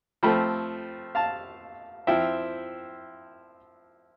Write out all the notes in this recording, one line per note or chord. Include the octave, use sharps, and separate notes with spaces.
F3 A3 C4 G5 B5
F5 A5
F3 C4 E4 E5 G5